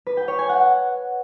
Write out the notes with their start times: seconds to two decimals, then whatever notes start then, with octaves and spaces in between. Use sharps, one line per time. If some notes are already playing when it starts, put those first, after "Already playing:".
0.07 B4
0.17 G5
0.28 C#5
0.39 G#5
0.49 F#5